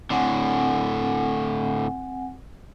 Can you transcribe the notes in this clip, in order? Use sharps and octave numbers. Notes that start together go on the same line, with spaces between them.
A2 D3 C4 F#5 G#5